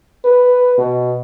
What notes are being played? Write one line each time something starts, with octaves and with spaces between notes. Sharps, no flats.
B4
B2